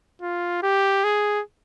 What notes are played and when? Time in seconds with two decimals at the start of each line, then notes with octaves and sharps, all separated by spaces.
0.22 F4
0.63 G4
1.04 G#4